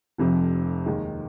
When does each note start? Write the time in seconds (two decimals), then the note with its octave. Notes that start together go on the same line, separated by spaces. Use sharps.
0.18 F1 F2 C3 F3
0.86 D#2 D#3 G#3